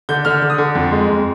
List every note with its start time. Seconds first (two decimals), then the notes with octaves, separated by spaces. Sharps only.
0.09 D3 G6
0.25 D3 F6
0.42 D3
0.50 D#6
0.58 D3
0.75 F2
0.91 G#3
1.09 F2